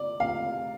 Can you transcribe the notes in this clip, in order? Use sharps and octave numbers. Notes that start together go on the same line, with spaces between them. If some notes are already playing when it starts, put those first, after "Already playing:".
Already playing: D5
F5